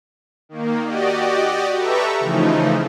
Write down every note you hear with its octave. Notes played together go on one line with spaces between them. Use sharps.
D#3 A#3
F#4 G4 D5 D#5
G4 A4 B4 E5 A#5 C#6
C#3 E3 F3 A3 D#4